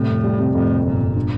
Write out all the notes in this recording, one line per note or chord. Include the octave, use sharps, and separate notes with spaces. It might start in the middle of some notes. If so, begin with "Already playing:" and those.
Already playing: A2 C3 G3
F2
G3
C3
F2 A2
C3
G1 A#2
G1
D4